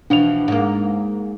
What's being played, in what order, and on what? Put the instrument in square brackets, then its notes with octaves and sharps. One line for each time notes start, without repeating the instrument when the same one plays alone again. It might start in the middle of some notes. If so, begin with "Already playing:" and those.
[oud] B2 E3 F3 [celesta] D4 F7
[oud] G#2 A#3